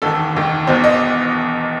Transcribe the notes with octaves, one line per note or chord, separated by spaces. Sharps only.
E1 D#2 D#3 A4
E1 D#2 D#3
E1 E2 B2 C5
D#5